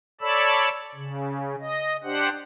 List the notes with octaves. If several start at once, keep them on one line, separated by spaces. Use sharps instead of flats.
A4 C#5 D5 A5 B5 E6
C#3
D#5
D4 G4 C5 F#5